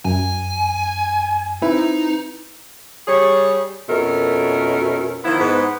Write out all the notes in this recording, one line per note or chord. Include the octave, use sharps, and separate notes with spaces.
F#2 G#5
C4 D#4 E4 B4
G3 G#4 C#5
F2 B2 A3 C#4 A#4
D#3 F3 B3 E4
G#2 B3